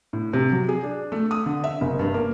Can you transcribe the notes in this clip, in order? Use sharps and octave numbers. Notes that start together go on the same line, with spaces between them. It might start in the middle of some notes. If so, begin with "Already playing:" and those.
A2
C3
F#3
G#4
D4
A3
D#6
D3
E5
F#1
G2
A#3